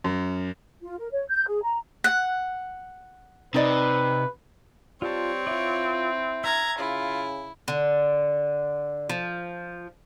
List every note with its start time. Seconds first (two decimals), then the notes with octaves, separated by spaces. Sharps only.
0.04 F#2
0.82 F4
0.99 A#4
1.12 C#5
1.29 G6
1.47 G#4
1.63 A#5
2.04 F#5
3.54 C3 D#4 B4 D5 D#5
5.02 G3 C4 F4 C#5 A5
5.47 E4 F4 D5
6.44 E5 A#5 F6 G#6
6.79 C#3 E4 F4
7.68 D3
9.09 F3